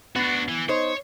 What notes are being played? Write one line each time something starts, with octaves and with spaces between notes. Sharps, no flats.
B3 D4 F#4
E3
D#4 C5 C#5